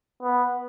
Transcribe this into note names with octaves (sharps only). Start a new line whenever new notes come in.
B3